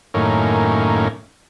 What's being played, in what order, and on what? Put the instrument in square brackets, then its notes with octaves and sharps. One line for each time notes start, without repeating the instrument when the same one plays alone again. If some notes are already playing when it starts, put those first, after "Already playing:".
[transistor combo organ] F#2 A2 D#3 A#3 C#4